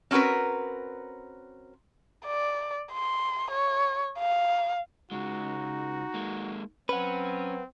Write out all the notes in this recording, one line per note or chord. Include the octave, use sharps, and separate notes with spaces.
C4 C#4 F#4 A#4 B4
D5
C6
C#5
F5
C#2 G#3 D#4 F#4
G#3 A#3
F#3 C4 C#4 B4 F#5